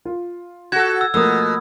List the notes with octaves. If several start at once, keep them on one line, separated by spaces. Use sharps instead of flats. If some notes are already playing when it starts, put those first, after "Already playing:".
F4
F#4 A4 G#6
E6
B2 F3 A3 A#3 D#6 E6